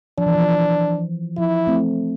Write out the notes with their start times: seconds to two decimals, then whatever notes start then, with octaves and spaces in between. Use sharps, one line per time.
0.18 F3 D4
0.26 E3
0.35 F3
1.38 F3 E4
1.67 A3 C4